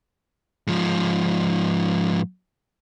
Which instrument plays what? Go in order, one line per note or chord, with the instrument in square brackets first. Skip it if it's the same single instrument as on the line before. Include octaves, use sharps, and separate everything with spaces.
[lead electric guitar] G#2 F3